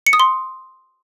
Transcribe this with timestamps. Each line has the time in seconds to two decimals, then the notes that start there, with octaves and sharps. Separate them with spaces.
0.07 C#7
0.13 D#6
0.20 C6